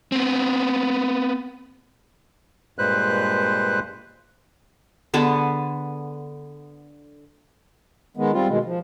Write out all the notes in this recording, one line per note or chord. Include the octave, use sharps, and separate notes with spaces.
B3 C4
G2 A#2 G#3 B4 C5 F#6
D3 B3 G#4 A5
D#3 G#3 B3
G3 C4 F4
B2 D#3 G#3
F3